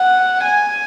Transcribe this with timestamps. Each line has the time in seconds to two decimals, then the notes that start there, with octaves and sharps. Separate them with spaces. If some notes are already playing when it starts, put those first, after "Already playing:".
Already playing: F#5
0.44 G#5